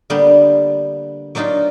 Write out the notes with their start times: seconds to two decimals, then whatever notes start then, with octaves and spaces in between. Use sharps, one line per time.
0.10 D3 G3 A#3 B3 G4
1.35 F#3 A#3 D4 D#4 F4